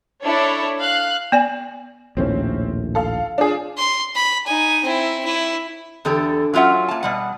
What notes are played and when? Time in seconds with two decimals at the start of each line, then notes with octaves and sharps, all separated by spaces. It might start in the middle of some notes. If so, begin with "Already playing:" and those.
0.23 D4 E4 A4 C#5
0.83 F5 F#6
1.32 B3 D5 G#5
2.17 A#1 D#2 A2 C4 C#4
2.95 A4 F5
3.38 D4 F4 G#4
3.77 C6
4.15 B5
4.46 D#4 G#5
4.83 C4 E4
5.25 E4
6.05 E2 D3 G4 A4
6.54 F#3 C#4 F4 E5 F#5
6.88 A#3 A5
7.03 B2 G3 F#5